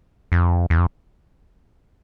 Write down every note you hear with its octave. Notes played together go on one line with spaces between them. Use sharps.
F2
E2
F2